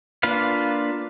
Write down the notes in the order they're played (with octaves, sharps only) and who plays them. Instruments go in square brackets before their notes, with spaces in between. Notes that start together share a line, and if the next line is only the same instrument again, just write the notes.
[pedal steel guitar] A#3 D4 F4 B4 F5